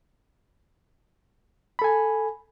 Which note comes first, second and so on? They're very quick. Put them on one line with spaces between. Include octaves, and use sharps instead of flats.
B5 A4 G#5